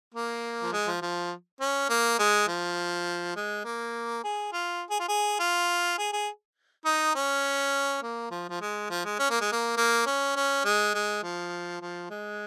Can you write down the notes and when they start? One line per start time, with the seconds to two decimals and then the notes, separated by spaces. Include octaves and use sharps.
0.15 A#3
0.63 F3
0.73 G#3
0.87 F3
1.02 F3
1.61 C#4
1.89 A#3
2.19 G#3
2.47 F3
3.36 G#3
3.65 A#3
4.24 G#4
4.53 F4
4.90 G#4
5.00 F4
5.09 G#4
5.39 F4
5.98 G#4
6.13 G#4
6.85 D#4
7.15 C#4
8.02 A#3
8.31 F3
8.49 F3
8.61 G#3
8.90 F3
9.05 G#3
9.19 C#4
9.30 A#3
9.41 G#3
9.52 A#3
9.77 A#3
10.06 C#4
10.36 C#4
10.65 G#3
10.94 G#3
11.23 F3
11.81 F3
12.10 G#3